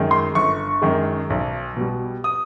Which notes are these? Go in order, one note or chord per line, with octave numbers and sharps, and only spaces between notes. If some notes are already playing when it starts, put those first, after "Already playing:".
Already playing: F#2 D#3 G#3
C6
G1 C#6
F#2 D#3 G#3
B1
B2 G3
D#6